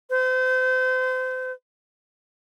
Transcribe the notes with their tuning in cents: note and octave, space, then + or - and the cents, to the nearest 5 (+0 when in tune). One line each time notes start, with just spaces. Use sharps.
C5 -35